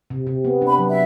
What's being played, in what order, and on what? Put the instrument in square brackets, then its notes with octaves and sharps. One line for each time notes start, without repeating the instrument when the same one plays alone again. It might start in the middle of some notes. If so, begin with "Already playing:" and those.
[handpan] C3
C3
B3
D4
[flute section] B5
[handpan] F#3
[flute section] E5